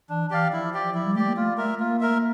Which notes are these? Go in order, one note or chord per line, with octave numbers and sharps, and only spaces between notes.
E3 D4
E3 G4 D5 F5
F3 E4
G4 D5
F3 E4
G3
A3 G4 D5
A#3
A3 F4
A3 A#4 E5
A#3 F4
A#4 E5